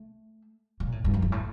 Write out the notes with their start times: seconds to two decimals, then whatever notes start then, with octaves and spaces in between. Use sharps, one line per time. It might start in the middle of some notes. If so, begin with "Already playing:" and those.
Already playing: A3
0.80 A#2
0.92 A2
1.04 G2
1.14 F2
1.22 G2
1.32 A2